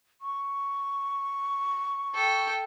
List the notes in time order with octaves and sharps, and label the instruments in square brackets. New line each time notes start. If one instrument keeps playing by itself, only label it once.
[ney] C#6
[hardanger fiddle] A4 G5